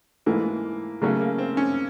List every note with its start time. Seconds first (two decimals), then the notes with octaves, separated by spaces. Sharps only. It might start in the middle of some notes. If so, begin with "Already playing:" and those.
0.26 G#2 E3 A3 A#3
1.01 C#3 F#3 A3 A#3 C#4
1.21 A#3
1.38 C4
1.57 C#4